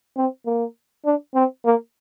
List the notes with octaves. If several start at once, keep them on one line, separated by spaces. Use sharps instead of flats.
C4
A#3
D4
C4
A#3